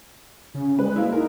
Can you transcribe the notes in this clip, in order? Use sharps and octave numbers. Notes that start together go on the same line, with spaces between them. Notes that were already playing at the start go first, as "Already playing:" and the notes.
C#3 C#4
G3 G#3 B4
G3 A#3 E4
D#4 A#4